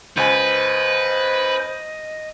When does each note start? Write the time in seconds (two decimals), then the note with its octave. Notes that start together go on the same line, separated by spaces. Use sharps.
0.17 C#2 B4 C5 D#5 G#5